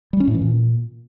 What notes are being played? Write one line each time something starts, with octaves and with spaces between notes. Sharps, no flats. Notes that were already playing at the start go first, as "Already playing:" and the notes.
G3
C#4
A2
E3
A#2